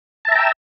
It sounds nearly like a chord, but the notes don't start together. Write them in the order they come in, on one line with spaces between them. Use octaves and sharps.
A5 E5 A#5 G5 E6